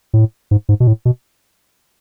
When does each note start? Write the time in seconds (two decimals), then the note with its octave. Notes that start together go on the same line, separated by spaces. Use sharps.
0.14 A2
0.51 G#2
0.69 G#2
0.80 B2
0.87 A2
1.05 B2